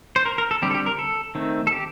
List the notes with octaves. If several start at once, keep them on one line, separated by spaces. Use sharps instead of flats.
C5
A#4
A#4
A4
D3 G3 C4 G4
A4
G4
A#4
A4
D#3 A3 C4
A4
G4